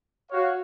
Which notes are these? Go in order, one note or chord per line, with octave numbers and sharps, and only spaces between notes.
F#4 C#5 F5